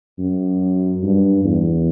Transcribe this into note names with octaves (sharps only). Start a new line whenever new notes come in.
F#2
G2
E2